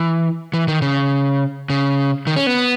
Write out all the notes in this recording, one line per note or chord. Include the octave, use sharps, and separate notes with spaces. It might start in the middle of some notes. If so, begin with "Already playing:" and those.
Already playing: E3
E3
D#3
C#3
C#3
D#3
C#4
B3